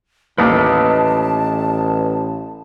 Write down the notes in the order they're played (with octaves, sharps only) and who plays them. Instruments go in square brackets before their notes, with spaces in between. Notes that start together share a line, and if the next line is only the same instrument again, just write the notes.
[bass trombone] A1 [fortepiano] D#2 [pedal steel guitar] B4 D#5 E6 [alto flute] A5